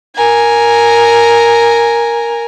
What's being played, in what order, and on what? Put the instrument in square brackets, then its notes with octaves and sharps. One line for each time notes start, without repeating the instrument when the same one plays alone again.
[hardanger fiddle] A#4 G#5